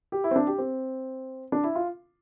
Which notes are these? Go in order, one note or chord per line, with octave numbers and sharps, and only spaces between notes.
G4
E4
C4
D4
G4
C4
D4
E4
F4